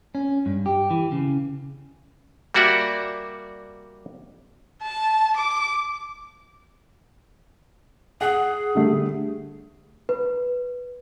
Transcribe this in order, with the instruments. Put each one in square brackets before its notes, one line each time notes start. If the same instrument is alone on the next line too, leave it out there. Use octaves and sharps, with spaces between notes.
[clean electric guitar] C#4
G2
G4
E3
C#3
[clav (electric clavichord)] G3 A#3 F#4 D5 E5
[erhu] A5
D6
[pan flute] G#4 [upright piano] F#5
[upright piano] D3 G3 A3
[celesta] B4